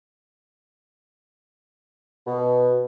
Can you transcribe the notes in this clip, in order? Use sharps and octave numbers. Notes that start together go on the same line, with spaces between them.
B2